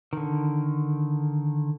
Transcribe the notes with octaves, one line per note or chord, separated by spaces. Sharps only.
D3 D#3